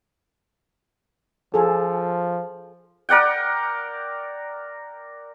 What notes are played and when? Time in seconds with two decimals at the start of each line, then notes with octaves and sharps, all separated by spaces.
1.54 F3 G#4 A4
3.09 A#4 D5 F#5 G5